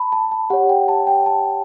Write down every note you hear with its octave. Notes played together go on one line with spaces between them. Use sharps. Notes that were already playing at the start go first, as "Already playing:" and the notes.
Already playing: A5 B5
A5
A5
G4 C#5 F#5
G5
A5
G5
A5